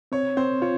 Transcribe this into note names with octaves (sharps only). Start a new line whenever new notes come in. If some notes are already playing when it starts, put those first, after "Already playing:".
C4 C#5
C4 C5
F4 C#5